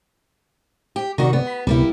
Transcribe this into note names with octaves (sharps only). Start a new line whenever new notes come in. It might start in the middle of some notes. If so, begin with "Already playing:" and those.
G4
C3 D#3 F#4 D5
B3
B5
D2 C3 G3 A#3 B3 E4